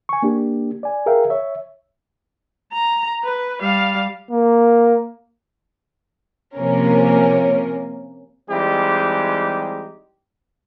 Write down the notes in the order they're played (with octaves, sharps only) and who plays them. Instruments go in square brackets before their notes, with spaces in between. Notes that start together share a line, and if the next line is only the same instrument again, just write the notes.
[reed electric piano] G#5 C#6
A#3 D4 G4
D5 G#5
G#4 A#4 E5 F5 G5
C#5 E5
[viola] A#5
B4
G3 F5
[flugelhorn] A#3
[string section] C3 F3 A#3 C#4 A#4
[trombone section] E3 G3 G#3 C4 D#4 G4